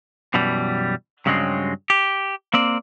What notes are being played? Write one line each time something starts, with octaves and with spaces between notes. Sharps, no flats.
F#2 B2 E3 G3
G2 C#3 F#3 G#3 C4
G4
A#3 C4 D5